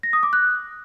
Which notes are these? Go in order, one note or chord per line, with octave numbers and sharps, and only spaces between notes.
A#6
D#6
D6
F#6